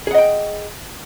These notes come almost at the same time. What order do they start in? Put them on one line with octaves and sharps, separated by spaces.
G#4 F#5 D#5 G5